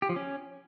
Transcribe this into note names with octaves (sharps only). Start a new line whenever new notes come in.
G4
F3
C#4